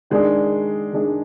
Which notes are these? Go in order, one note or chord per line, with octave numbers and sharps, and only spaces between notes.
D#3 G#3 D4 G#4 D5
D#3 G#3 D4 G#4 D5